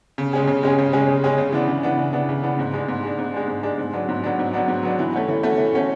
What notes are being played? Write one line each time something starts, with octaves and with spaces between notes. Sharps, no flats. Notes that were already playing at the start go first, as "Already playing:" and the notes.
C#3
G#3 C#4 G#4
C#3
G#3 C#4 G#4
C#3
G#3 C#4 G#4
C#3
G#3 C#4 G#4
C#3
E3 B3 D4
C#3
E3 B3 D4
C#3
E3 B3 D4
C#3
E3 B3 D4
G#2
G#3 D4
G#2
G#3 D4
G#2
G#3 D4
G#2
G#3 D4
G#2
F#3 B3 D4
G#2
F#3 B3 D4
G#2
F#3 B3 D4
G#2
F#3 B3 D4
E3
A3 C#4 F#4
E3
A3 C#4 F#4
E3
A3 C#4 F#4